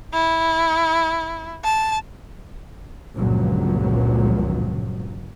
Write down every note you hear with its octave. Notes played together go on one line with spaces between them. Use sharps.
E4
A5
G1 C#2 G2 A#2 F3 F#3